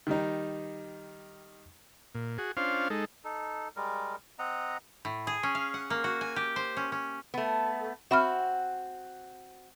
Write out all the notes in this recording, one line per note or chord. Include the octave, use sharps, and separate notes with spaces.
D#3 G3 D#4
A#2
F#4 G#4
C#4 D4 F4 C5 F5
G#3 D#4 A4
D#4 A4
G3 G#3 A#4
C4 D#5 F#5 A#5
A2
G#4
C#4
F5
F#5
A#3
F#4
G#5
G4
C5
C#4
C#4
A3 B3
C4 F#4 E5 B5 F6